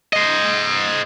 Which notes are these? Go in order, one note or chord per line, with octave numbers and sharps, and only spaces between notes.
C5 D#5